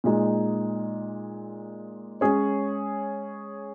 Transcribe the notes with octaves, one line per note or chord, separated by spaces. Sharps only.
A#2 G#3 D#4
G#3 C#4 G#4 C#5